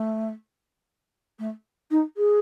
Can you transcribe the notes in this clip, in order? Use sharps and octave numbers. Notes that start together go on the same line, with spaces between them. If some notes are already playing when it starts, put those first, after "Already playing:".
Already playing: A3
A3
D#4
G#4